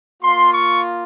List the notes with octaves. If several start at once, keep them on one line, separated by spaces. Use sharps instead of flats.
A#3 F4 C6
C#6